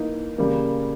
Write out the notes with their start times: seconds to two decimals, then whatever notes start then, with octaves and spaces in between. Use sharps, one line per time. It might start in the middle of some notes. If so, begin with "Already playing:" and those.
Already playing: E3 A#3 D#4
0.38 C#3 G3 A#3